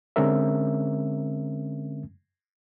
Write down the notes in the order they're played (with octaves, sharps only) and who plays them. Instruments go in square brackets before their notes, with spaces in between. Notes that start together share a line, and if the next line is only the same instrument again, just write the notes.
[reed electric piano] D3 G#3 C4 C#4 A#4 E5